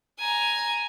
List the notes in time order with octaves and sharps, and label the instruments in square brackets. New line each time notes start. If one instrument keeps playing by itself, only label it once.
[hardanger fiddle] G#5 A#5